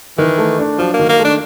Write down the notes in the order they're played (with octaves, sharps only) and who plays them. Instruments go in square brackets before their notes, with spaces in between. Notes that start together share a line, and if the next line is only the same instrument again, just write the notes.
[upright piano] D#3 [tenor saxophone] E3
[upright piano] A3
D4
[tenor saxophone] F3 [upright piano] F#3
[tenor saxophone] A#3
[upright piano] D#3
[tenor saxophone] A#3
[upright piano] A3
[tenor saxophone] D4